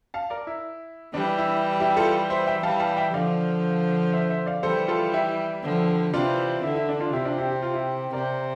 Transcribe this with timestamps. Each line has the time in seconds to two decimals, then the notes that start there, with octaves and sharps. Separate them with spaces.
0.14 F5 A5
0.30 A#4 D5
0.47 E4
1.13 E3 G3 D4
1.38 E4
1.80 E4 G4
1.97 F4 A4
2.30 C5 E5
2.47 E5 G5
2.63 E3 G3 F5 A5
2.80 F5 A5
2.97 E5 G5
3.13 D3 F3 D5 F5
4.14 C5 E5
4.30 C5 E5
4.46 D5 F5
4.63 E3 G3 A4 C5
4.88 F4 A4
5.14 E4 G4
5.63 D3 F3
6.13 C3 E3 D4 F4
6.63 D3 E4
6.76 E4
6.89 D4
7.00 D4 F4
7.13 C3 E4 G4
7.25 D4 F4
7.38 E4 G4
7.51 G4
7.62 F4
7.74 E4 G4
8.13 C3 A#4 D5